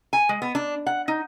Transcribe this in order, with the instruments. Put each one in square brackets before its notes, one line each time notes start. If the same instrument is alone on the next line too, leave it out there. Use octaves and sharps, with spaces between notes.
[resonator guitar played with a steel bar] G#5
G#3
B3
D4
F#5
D#4